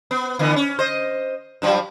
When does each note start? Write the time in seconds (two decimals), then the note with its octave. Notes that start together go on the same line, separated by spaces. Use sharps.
0.11 B3
0.39 D3 E3 B3
0.56 C#4
0.79 C5 D#5
1.62 G2 F3 F#3